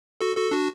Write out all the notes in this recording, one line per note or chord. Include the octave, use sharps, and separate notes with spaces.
F#4 A4
F#4 A4
D4 F#4